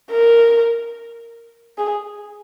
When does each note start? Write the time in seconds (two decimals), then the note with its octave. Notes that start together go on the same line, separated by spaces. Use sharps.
0.11 A#4
1.78 G#4